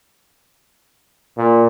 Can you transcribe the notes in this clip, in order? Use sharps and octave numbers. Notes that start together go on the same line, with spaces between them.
A#2